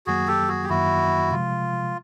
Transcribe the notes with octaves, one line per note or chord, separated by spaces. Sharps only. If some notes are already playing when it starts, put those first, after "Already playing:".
F#2 D#3 F#3 A#3 F#4 G#4
G4 A4
F#4 G#4
G4
F#2 D#3 F#3 A#3 E4 F#4
C3 F3 G#3 F4